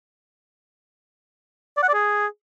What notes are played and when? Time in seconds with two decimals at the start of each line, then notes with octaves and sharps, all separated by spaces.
1.77 D5
1.83 F#5
1.89 D5
1.94 G#4